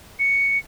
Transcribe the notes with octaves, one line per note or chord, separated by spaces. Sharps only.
C#7